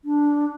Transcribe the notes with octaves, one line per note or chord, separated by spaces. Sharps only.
D4